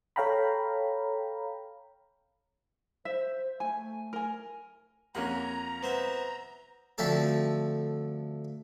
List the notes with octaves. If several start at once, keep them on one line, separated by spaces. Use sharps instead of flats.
A4 C#5 F5 G5 A#5 B5
C5 E5
A3 G#5
A#4 G#5
F2 A#3 C#4 F#5 A#5
B3 C5 E5
D2 F3 A3 C4 A4 A5